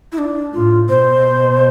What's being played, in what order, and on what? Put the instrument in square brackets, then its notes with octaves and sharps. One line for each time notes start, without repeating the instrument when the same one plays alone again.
[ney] E4
D4
[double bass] A2 [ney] F4
[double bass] B2 [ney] C5